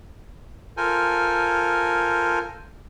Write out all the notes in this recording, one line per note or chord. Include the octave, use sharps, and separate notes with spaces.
F4 A4 A#4 C5 G#5